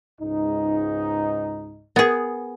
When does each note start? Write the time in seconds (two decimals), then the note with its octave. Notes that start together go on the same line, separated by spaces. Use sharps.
0.20 C#2 G#2 D#4
1.96 B3 G#4 A#4